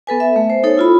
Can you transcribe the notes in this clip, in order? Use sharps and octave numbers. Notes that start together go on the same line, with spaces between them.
B3 A4 B4 G#5
E5
A3
C5
D#4 A4 C#5
E4 F4 B5